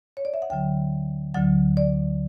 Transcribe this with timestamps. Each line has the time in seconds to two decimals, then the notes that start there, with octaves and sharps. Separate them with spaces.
0.17 C#5
0.25 D5
0.34 E5
0.42 F#5
0.50 D2 D3 F#3 G5
1.34 D2 D3 F#3 F#5
1.77 D5